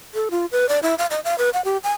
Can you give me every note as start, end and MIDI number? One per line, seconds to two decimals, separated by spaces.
0.14 0.29 69
0.31 0.46 65
0.52 0.68 71
0.69 0.79 74
0.83 0.95 64
0.98 1.06 77
1.11 1.20 75
1.25 1.37 77
1.38 1.50 71
1.53 1.64 78
1.65 1.77 67
1.84 1.92 80